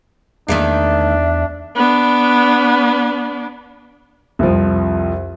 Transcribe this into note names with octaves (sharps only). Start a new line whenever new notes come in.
E2 D#3 A3 A#3 D4 E5
B3 D4
C2 F2 F3